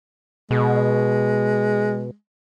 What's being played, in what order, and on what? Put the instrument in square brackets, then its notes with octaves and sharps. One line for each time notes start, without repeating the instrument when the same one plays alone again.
[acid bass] B2 [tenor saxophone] G#3